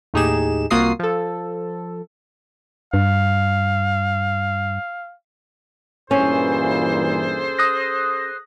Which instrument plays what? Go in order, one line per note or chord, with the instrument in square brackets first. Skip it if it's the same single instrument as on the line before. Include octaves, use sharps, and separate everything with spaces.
[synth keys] D#2 A2 D#4 G4 G#4 E7
C2 A#3 F4 F#4 D#6 C7
F3 A4
[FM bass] G2 [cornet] F5
[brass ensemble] G2 A#2 E3 [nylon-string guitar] C#4 [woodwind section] G#4 A4 C5
[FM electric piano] D#6 F#6 A#6